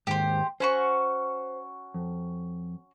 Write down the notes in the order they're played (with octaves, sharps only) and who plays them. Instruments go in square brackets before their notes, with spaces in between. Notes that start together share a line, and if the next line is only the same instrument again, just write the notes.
[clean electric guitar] D#2 G#2 [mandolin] G4 C5
[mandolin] C#4 F#4 C#6 [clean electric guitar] C5
[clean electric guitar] F2